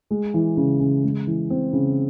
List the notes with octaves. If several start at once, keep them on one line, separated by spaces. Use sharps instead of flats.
G#3
E3
C#3
C#3
G#3
E3
C4
C#3